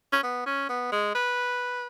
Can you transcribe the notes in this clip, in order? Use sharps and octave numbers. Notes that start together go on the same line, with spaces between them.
C#4
B3
C#4
B3
G#3
B4